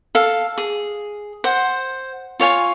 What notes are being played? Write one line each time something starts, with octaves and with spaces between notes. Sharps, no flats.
A4 F5
G#4
C5 F#5
F4 C#5 F5 G#5